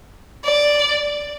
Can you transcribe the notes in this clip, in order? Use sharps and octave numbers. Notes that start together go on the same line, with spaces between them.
D5